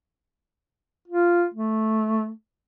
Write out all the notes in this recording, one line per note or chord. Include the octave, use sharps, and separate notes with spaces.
F4
A3